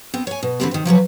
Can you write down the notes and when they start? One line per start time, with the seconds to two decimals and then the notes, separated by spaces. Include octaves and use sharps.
0.14 B3 C4
0.27 C#5 G#5
0.43 B2
0.60 D3 E3 F#3 C4 G4 B4
0.71 C3 D#3
0.85 F3 F#3 F#4 B4